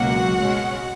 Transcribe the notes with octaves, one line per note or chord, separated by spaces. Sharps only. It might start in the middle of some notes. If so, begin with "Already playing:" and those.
Already playing: C#2 B2 F#3 A#3 F#4 F#5
B2 G#3 C#4